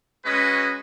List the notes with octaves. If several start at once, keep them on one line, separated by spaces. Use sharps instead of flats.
G#3 C#4 F#4 B4 D#5